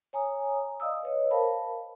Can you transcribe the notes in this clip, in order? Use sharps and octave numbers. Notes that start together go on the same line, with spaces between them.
C#5 G#5 A#5 D#6
D5 D#5 F5 D#6 E6
B4 C#5 D#5
A#4 C5 F5 A5 B5